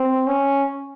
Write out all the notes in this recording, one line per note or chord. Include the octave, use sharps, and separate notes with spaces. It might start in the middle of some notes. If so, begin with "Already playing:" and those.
Already playing: C4
C#4